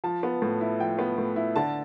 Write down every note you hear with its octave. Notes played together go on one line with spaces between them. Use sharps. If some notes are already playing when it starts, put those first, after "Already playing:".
F3 A5
B3
A2
E4
F3 G5
B3
A2
E4
D3 A5